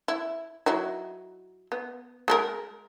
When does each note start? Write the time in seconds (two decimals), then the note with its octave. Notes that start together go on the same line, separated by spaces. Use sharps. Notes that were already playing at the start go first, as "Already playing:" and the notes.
0.08 E4
0.66 F#3 D#4 E4
1.72 B3
2.28 G#3 A4 A#4